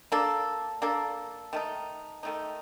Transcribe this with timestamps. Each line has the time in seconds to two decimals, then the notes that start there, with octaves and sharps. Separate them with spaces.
0.12 A#3 D4 A4
0.82 A#3 D4 A4
1.53 D#3 A3 D#4
2.23 D#3 A3 D#4